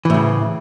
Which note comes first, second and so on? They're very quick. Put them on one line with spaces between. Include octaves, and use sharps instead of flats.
E3 A2 C#3